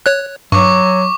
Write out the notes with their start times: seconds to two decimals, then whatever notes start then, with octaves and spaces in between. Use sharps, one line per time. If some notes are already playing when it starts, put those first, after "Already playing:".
0.06 C#5 F#6
0.52 G2 F#3 C#6 D6